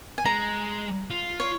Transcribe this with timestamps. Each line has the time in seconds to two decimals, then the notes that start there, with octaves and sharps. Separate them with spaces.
0.18 G#5
0.25 G#3 A#5
1.10 F4
1.40 C#5